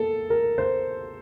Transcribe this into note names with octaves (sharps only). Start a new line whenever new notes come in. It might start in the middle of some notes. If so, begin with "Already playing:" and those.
Already playing: A#3 A4
A#4
C5